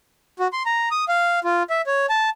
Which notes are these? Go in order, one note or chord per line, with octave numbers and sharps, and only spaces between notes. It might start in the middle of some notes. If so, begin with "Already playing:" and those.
F#4
C6
A#5
D#6
F5
F4
E5
C#5
A5